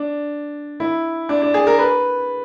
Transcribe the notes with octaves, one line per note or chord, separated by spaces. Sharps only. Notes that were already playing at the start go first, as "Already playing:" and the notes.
Already playing: D4
E4
D4
D4
G#4
A#4
B4